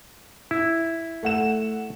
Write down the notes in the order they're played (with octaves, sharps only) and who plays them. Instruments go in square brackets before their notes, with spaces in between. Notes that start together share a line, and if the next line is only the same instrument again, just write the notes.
[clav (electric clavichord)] E4
[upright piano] A3 F#5 E7